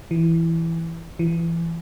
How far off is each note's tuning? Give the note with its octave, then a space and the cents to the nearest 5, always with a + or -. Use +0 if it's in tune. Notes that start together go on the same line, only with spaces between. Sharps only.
E3 +5
E3 +25